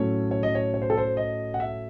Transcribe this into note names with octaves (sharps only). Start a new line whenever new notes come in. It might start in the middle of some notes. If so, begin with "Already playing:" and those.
Already playing: A2 F#3 A3 C#4 C#5
C#5
D#5
C#5
C#5
C5
A4
C5
D#5
F#5
E5